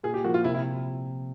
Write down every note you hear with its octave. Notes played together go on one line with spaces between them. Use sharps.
A#2 G#4
G4
F3 A#3 F#4
F4
C3 E4
E4